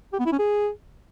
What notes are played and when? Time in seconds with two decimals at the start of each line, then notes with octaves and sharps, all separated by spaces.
0.13 G4
0.19 B3
0.26 E4
0.32 C#4
0.39 G#4